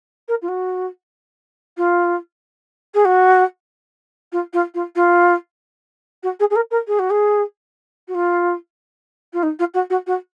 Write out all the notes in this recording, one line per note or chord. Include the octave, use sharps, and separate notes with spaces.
A#4
F4
F#4
F4
G#4
F#4
F4
F4
F4
F4
F#4
G#4
G#4
A#4
A#4
G#4
F#4
G#4
F#4
F4
F4
D#4
F4
F#4
F#4
F#4